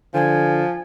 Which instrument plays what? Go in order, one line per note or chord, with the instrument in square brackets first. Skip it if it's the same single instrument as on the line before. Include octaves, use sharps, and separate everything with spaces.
[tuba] D3 [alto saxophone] F3 [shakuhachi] G#5